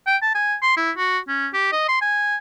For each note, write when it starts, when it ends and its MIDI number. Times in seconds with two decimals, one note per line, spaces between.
0.06 0.17 79
0.22 0.31 81
0.35 0.56 80
0.62 0.76 84
0.76 0.91 64
0.97 1.18 66
1.28 1.47 61
1.53 1.72 67
1.72 1.88 75
1.88 1.97 84
2.01 2.36 80